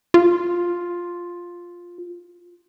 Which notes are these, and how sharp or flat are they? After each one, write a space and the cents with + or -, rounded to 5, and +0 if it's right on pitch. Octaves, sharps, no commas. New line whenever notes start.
F4 +5